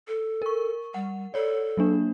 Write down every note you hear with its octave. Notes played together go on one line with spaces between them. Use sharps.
A4
A#4 C#6
G3 F#5
A4 C#5 D5
F#3 A#3 D4